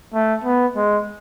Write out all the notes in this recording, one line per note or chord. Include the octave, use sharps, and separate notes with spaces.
A3
B3
G#3